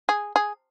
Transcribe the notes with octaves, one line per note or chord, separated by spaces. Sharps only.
G#4
G#4